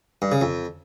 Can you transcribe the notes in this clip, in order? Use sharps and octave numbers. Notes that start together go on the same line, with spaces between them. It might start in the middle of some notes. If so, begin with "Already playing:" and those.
G2
C#3
F2